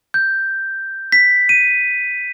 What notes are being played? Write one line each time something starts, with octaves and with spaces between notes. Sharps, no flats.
G6
B6
D#7